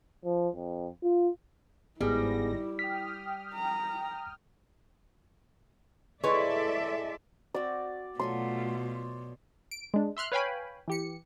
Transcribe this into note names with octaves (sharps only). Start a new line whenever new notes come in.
F3
F2
F4
G1 G#2 G3 B3 E4 G#4 A#6
G5 D#6 F6 B6
A#5
G#3 E4 A4 B4 C#5 D5 E5
C4 F#4 D5
B2 F#3 A3 F4 A4 G#5 C6
D7
G#3 D4
E5 C6 F6 F#6
B4 C#5 F5 G5 G#5 B5
E3 G4 C#7